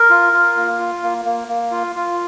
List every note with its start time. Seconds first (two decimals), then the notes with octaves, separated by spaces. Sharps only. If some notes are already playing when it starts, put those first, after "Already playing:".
Already playing: A#4
0.10 F4
0.33 F4
0.57 A#3
0.79 F4
1.02 A#3
1.25 A#3
1.48 A#3
1.71 F4
1.96 F4